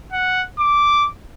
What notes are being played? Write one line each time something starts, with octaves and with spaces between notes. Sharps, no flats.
F#5
D6